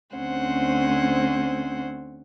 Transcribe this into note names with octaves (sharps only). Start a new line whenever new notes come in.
D2 C4 C#4 C5 F#5